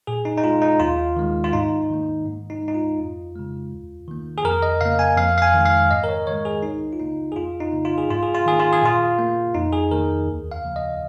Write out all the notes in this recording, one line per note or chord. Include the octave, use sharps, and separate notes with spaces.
A#2 G#4
D#4
D#4
G#3 F4
D#4
D#2 F4
D#3 G#3
F4
G#2 D#4
D#3 A#3
G#2
D#4
G#3
D#4
F4
F2
C#3 G#3
D#2
D#3 A#3
G#4
F2 A#4
D#5
C#3 A#3 F5
G#5
F2 F5
F5
G#5
D#3 G#3
F5
G#2 D#5
A#4
C#5
D#3 G#3 C#5
G#4
C#2 D#4
F4
C#3 A#3 D#4
G#4
F2 F4
D#4
C#3 A#3
F4
G#4
G#2 F4
G#4
F4
D#3 A#3 G#4
F4
G#4
A#2 F4
A#3
F2 D#4
G#4
D#3 A#3 A#4
D#2
F5
C#3 F3 A#3
D#5